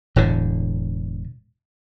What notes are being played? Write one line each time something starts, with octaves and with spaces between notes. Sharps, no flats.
E1 A2 D3